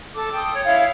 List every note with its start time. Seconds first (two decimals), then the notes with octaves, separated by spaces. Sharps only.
0.15 A4 D6
0.35 G5 C6 D#6
0.54 C#5
0.66 E4 C#5 F5